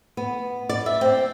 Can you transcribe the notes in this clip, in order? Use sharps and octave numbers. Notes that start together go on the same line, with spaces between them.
B3
D5
E5
C4